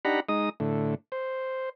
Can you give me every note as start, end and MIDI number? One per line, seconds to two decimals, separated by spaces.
0.05 0.20 62
0.05 0.20 63
0.05 0.20 67
0.05 0.20 78
0.05 0.20 82
0.05 0.20 83
0.29 0.49 56
0.29 0.49 63
0.29 0.49 87
0.60 0.95 45
0.60 0.95 50
1.12 1.69 72